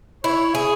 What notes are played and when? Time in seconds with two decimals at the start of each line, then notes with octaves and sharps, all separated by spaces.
0.23 E4 C#5
0.55 G#4